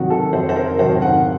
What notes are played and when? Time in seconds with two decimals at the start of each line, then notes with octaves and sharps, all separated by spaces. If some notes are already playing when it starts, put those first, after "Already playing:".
Already playing: C3 D#3 F#3 F#4
0.10 A4
0.33 F2 C5
0.49 C5
0.56 A#4
0.79 C3 D#3 F#3 C5
1.02 F#5